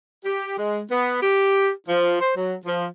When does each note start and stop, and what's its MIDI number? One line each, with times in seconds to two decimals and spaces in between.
0.25 0.57 67
0.58 0.80 56
0.91 1.17 59
1.22 1.70 67
1.88 2.17 53
2.20 2.33 72
2.36 2.54 54
2.66 2.86 53